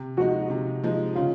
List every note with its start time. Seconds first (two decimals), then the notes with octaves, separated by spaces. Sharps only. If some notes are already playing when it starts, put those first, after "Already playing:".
Already playing: C3
0.17 F3 G#3 D#4 F#4
0.50 C3
0.84 F3 G#3 D#4
1.15 C#3 F4